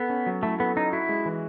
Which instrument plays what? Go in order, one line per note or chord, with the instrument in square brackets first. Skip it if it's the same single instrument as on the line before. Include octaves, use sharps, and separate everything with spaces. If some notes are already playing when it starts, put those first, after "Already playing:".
Already playing: [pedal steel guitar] B3 [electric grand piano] A4
[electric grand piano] C#4
F#3
[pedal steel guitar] A3 [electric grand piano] E4
[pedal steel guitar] B3 [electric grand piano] A4
[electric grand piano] C#4 [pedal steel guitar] D#4
[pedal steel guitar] E4 [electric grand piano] F#4
[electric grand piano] G#3
E3